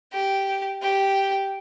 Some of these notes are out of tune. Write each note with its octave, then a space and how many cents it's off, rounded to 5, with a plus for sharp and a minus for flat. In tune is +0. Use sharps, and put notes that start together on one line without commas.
G4 -10
G4 -5